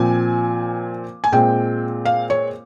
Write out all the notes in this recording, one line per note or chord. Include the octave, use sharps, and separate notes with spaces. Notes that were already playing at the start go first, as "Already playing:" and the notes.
Already playing: A#2 F3 C4 G#5
G#5
A#2 G#3 C4 G5
F5
C#5